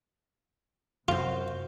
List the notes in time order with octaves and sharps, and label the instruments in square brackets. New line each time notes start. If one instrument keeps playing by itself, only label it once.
[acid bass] F#2 [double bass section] C3 [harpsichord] F4 [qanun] F#4 C5